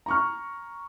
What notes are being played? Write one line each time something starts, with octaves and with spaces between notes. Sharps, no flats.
A#5 C#6 F6